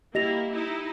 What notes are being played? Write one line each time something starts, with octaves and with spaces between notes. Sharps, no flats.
A#3 E4 G4 D#5 A#6 F7
D#4 E4